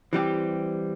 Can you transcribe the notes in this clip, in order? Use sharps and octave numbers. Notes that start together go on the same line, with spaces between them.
E3 G3 C4 G4